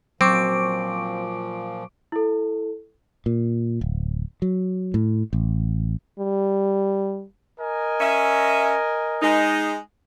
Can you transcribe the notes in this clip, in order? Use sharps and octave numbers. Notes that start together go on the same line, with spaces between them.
A#2 F3 F#3 C4 C#6 D6 D7
E4 A4
A#2
D1
F#3
A2
A1
G3
A#4 D#5 G#5
C#4 E5
G#3 D#4